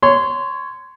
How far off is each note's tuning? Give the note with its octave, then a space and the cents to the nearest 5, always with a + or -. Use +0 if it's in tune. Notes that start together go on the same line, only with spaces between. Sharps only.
C#5 +0 C6 -20